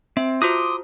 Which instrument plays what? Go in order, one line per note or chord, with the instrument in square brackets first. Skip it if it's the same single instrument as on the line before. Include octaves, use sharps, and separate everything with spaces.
[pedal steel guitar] C4 [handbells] E5
[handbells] F4 F#4 C5 [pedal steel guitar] C6 D6 D#6